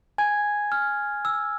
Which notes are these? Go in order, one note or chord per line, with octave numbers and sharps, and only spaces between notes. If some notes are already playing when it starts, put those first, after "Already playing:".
G#5 G#6
F6
E6